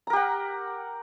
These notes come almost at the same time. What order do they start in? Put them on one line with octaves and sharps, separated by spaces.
A#5 A#4 G4 F#5